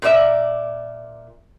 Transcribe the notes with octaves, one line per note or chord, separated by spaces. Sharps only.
A#2 A#4 D5 E5